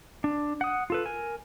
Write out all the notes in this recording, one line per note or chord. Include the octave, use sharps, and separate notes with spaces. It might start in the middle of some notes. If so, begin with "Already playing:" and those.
D4
F#5 D#6
F4 A4 B4
A#4 G#5